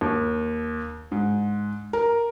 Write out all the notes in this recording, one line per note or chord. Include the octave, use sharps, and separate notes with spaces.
D#2
G#2
A#4